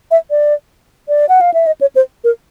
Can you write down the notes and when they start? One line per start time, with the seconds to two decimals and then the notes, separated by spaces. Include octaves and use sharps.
0.11 E5
0.31 D5
1.09 D5
1.29 F#5
1.41 F5
1.54 E5
1.67 D#5
1.81 C#5
1.96 C5
2.24 A#4